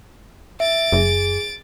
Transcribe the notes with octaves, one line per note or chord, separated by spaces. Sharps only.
E5 A6 D7
F#1 G#4